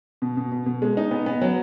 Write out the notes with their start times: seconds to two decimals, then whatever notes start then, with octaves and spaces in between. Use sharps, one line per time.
0.22 B2
0.37 B2
0.52 B2
0.66 B2
0.82 G#3
0.97 D#4
1.11 B3
1.26 B3
1.41 F#3